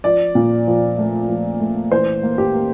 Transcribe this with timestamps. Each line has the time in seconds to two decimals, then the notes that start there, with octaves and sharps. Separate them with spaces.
0.04 F3 D5
0.35 A#2
0.67 F3
0.98 A3
1.29 F3
1.60 A3
1.92 E3 C5
2.23 A#3
2.38 G4
2.54 A#3